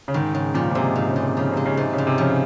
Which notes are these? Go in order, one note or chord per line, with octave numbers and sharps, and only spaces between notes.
C#3
G#2 D#3
G#2 C#3
A#2 F3
A#2
C3 G#3
G#2 C3
C#3
G#2
C3
C#3 F3
C3
G#3
C#3
G#2 C3
C#3
G#2
C3
C#3 F3